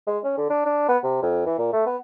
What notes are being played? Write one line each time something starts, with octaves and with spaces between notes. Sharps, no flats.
G#3
C#4
D3
D4
D4
B3
C3
F2
E3
A#2
A3
B3